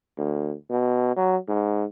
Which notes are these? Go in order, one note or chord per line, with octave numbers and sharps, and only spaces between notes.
D2
B2
F#3
G#2